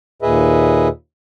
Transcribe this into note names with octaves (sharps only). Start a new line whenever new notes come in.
D#2 A#2 G#4 B4 D#5 E5